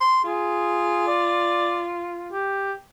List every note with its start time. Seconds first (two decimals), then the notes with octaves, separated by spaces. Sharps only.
0.01 C6
0.24 F4 G#4
1.08 D5
2.33 G4